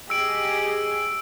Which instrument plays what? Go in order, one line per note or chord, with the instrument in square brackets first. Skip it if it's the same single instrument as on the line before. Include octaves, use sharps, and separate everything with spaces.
[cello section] G4 G#4 D#5 [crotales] E6 D7